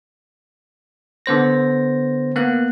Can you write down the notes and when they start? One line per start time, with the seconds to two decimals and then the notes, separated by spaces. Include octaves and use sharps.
1.26 D3 B3 C5 A#6
2.36 A#3 B3 F#6